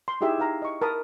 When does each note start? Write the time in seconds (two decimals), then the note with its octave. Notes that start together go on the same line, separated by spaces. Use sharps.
0.08 C6
0.21 D#4 E4 G4 G#4 E5
0.38 D#4 F5 A#5
0.62 D#5 C#6
0.82 A#4 A5 B5 D#6